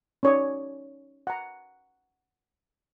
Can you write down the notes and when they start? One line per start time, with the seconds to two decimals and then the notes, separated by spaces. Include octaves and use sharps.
0.23 C#4 D#4 C#5 D5 D#6
1.27 F#5 A#5